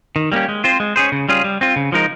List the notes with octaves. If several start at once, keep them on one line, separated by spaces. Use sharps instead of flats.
D#3
G3 A#3 C#4 G4
G#3
C4 F4 C5
G#3
C#4 G#4 C5
C#3
G3 C#4 F4 G#4
G3
C4 F4
C#3
F3 G#3 D#4 A#4